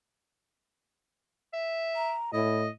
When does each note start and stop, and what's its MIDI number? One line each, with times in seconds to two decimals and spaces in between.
1.53 2.14 76
1.96 2.31 82
2.33 2.67 45
2.33 2.61 64
2.33 2.68 75